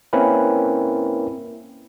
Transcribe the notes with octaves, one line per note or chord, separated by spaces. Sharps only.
A#3 C4 C#4 E4 A#4 B4